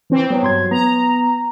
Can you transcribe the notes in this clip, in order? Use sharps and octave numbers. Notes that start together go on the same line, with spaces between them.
E3 C4
F#3 B3
G2 C6 G#6
B3 A#5